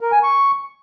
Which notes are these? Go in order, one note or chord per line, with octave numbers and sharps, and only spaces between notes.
A#4
G#5
C#6